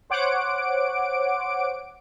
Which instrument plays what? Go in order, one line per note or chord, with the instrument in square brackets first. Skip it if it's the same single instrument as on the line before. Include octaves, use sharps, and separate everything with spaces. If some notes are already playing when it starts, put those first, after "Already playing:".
[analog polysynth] C5 C#5 F#5 D6 D7